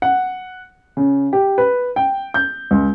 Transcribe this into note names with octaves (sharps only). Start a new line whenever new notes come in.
F#5
C#3
G4
B4
G5
G6
C#2